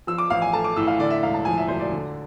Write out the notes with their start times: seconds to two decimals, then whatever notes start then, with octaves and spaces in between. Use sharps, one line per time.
0.07 F3 E6
0.18 D6
0.30 A1 F5
0.42 G#5
0.53 A3 A5
0.64 D6
0.76 A2 E6
0.87 F5
0.99 D3 D5
1.10 E5
1.23 E1 F5
1.34 A5
1.45 F3 G#5
1.58 E5
1.68 D2 C5
1.79 D5
1.92 D3